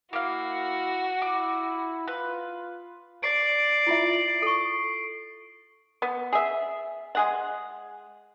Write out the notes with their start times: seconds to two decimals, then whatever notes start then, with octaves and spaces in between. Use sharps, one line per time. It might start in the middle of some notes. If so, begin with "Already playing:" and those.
0.13 A#3 E4 F#4 F5
1.22 E4 D6
2.08 F4 B4
3.23 D5 C7 D7
3.87 E4 F4 E5
4.42 A4 C#6
6.02 B3
6.33 G#4 E5
7.15 G#3 G#4 F#5